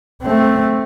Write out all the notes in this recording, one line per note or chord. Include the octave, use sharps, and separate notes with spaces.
A3 C4